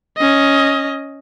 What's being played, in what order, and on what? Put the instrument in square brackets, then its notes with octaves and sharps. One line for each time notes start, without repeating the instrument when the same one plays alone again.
[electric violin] C#4 D#5